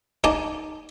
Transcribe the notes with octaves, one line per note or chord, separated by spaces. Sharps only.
D#4 D5 G#5 A5